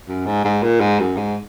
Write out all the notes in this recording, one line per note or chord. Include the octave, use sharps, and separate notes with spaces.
F#2
G#2
G#2
A#2
G#2
F#2
G#2